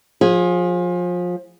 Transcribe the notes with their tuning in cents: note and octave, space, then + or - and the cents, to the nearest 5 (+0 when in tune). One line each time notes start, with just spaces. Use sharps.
F3 +30 G#4 -5